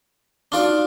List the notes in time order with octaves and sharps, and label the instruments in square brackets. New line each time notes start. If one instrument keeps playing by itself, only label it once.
[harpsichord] D4 F4 D5 [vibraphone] D#4 F#4